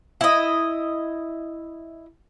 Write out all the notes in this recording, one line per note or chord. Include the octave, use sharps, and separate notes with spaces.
E4 D#5